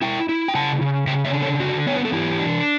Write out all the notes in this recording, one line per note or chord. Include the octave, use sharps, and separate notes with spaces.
E4 E5 G5
E4
G5
C#3 F#5 A5
C#3
C#3 E5 G5
C#5 E5
D4
A4 C#5
D3 F#4
B3 C#5
B4
A4
E3 E4 G4
D4